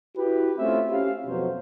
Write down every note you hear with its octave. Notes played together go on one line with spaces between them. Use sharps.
E4 F#4 G4 B4
A3 C4 C#4 F4 E5
C#4 G4 F5
F2 B2 F#3 C5